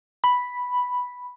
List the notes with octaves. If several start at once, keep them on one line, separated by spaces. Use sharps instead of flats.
B5